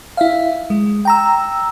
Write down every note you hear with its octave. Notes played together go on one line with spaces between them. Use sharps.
E4 E5 F5
G#3
G5 A#5 E6